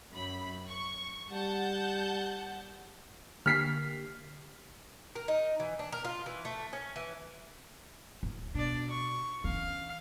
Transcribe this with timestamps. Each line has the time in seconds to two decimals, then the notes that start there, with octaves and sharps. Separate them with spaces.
0.12 F#2 B5
0.67 C#6
1.30 G3 F#5 A5 G6
3.46 D3 A#3 G4 F6 B6 C7
5.15 A#4
5.28 D#4
5.60 E3
5.79 D4
5.92 A#4
6.04 F4
6.26 E3
6.45 A3
6.73 C#4
6.96 E3
8.23 D1
8.55 B2 D4 D5
8.90 C#6
9.44 E3 C#4 F5